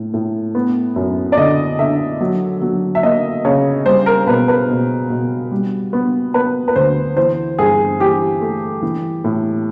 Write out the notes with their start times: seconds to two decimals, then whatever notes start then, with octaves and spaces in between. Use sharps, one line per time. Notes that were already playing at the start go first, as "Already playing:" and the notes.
Already playing: A2
0.14 A2
0.55 B3
0.96 F#2
1.32 D5
1.37 D3 D#5
1.79 D3 E5
2.21 F#3
2.62 F#3
2.95 E5
3.03 A#3 D#5
3.45 C#3 C#5
3.86 G3 C5
4.06 A#4
4.27 B2 B4
4.48 B4
4.69 B2
5.10 B2
5.52 G3
5.93 B3
6.34 B3 B4
6.68 B4
6.76 D2 C5
7.17 E3 C5
7.58 G2 G#4
8.00 E3 G4
8.41 A3
8.82 E3
9.24 A2